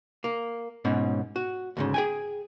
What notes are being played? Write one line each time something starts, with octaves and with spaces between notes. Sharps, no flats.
A#3
G#2 B2 C#4
F#4
D2 G#2 C#3
G#4 G5 G#5